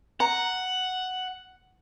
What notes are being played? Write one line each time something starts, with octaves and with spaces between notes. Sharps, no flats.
F#5 A#5